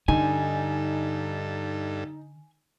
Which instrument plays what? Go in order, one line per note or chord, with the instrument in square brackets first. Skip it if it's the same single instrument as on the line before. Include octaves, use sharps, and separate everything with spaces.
[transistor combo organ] G2 A4 [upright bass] D3 [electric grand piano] D#4 [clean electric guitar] G#5